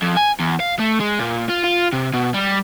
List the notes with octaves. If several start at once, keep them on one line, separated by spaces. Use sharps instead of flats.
F2
G#5
E2
F5
A3
G#3
A#2
F4
F4
C3
B2
G3